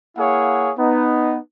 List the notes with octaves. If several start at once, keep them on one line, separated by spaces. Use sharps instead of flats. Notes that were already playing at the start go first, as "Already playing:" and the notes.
A#3 E4 G#4 C#5 F5 F#5
B3 D#4